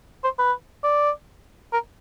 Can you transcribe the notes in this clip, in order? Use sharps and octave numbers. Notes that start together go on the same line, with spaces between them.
C5
B4
D5
A#4